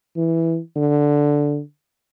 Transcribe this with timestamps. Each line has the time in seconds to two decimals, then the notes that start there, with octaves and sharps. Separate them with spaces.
0.16 E3
0.76 D3